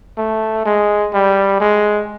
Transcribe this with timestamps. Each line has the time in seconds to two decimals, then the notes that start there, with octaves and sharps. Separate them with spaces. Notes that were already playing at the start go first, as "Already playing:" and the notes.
0.18 A3
0.65 G#3
1.13 G3
1.60 G#3